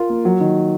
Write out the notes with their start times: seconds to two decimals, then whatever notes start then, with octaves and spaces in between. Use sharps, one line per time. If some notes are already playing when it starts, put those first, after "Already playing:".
Already playing: F4 A#4
0.09 A#3
0.25 F#3
0.40 D#3